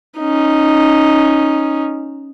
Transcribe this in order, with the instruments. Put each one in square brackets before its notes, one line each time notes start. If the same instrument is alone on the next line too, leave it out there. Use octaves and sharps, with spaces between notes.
[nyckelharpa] C#4 D#4